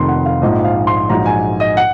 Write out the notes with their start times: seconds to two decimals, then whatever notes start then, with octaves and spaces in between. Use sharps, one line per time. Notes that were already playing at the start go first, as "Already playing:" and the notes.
Already playing: F1 F2 D#3 C6
0.08 F#5
0.26 F5
0.42 A#1 G#2 F3 D#5
0.65 F5
0.87 C6
1.09 A#1 G#2 F#3 A#5
1.26 G#5
1.60 D#5
1.77 F#5